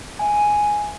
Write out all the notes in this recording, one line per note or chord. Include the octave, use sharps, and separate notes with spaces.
E5 G#5